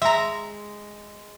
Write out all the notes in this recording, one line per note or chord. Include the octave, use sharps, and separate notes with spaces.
G#3 E5 A#5